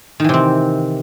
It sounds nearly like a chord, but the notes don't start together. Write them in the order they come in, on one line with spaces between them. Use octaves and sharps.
D#3 E3 C3 C4